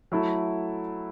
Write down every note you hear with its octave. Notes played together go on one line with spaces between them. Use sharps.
F#3 A3 E4 A4